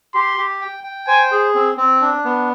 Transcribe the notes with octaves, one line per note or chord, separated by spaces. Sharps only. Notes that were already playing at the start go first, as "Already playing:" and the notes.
G4 C6
G4
G5
G5
C5 G#5
G#4
C4
C4
D4
B3